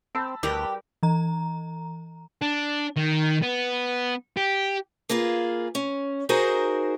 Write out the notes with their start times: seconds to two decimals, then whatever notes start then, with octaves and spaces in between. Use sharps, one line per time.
0.15 C4 A5 B5 E6
0.43 D2 G3 G4 A#4 B4
1.03 E3 A#5
2.42 D4
2.96 D#3
3.42 B3
4.37 G4
5.09 A#3 F4 G#4 B4
5.75 C#4
6.29 D#4 F#4 G#4 A#4 C5 G#5